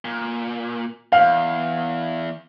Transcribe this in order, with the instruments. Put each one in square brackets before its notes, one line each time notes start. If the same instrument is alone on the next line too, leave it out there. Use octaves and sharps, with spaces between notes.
[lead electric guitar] A#2
[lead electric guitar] E2 [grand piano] F5